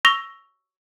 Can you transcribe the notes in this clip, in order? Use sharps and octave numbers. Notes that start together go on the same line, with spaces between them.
C#6 E6 A#6 F7 G7